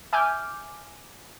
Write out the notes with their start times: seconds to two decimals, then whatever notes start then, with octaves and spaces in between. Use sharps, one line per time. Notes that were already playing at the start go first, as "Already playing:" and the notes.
0.13 E5 G#5 D6 F6 G6